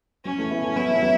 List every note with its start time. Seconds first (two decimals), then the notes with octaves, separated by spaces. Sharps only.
0.25 F#3 C#4
0.38 E3 A3
0.50 B3 E4
0.64 E3 A3
0.76 F#3 B3 E4
0.95 C#4
1.02 F#3 B3